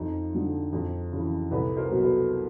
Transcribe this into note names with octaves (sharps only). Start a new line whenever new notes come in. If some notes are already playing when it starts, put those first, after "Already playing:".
Already playing: F2 D#4 F4
D3 F3
F2
C#3 E3
C2 A4 B4
A#4 C5
B2 F#3
A4 B4